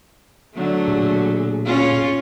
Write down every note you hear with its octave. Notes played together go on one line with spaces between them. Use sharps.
D3 F#3 A3
A#2 G#4
C#4 F4